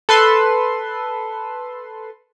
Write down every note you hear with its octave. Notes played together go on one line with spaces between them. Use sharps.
A4 B4 C6